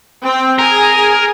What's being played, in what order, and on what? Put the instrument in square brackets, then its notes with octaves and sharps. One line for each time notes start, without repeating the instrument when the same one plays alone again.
[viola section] C4 G5
[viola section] G#4 G#5 [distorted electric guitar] A#4